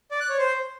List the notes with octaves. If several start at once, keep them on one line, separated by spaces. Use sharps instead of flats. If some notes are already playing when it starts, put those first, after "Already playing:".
D5
F#6
C#5
C5